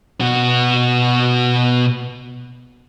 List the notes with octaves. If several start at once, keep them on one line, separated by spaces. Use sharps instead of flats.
B2 F#4